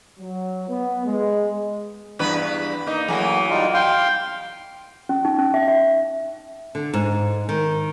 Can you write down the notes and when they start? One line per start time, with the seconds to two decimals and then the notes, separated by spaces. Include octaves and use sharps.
0.20 F#3
0.69 B3
1.06 G#3
2.19 E2 G2 B4
2.86 A#3 D#4
3.08 E3 F#3 A3 A#3 G#4
3.50 G3 D#4 F4
3.74 F5 G5 C6
5.09 C#4
5.25 D#4
5.39 C#4
5.54 E5
5.68 E5
6.75 D3
6.94 G#2
7.49 D#3